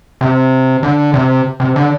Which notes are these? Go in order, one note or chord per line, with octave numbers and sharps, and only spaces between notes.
C3
D3
C3
C3
D3